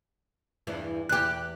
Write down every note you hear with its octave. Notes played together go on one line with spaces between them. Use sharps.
E2 G2 E3
E2 G4 F#6